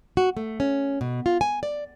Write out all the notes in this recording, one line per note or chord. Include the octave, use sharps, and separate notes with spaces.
F#4
A3
C#4
B2
F4
G#5
D5